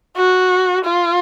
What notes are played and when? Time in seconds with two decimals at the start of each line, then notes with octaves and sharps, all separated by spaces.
0.17 F#4
0.85 F4